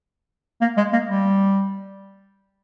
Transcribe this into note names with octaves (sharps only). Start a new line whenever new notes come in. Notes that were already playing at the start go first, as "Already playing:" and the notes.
A#3
G#3
A#3
G3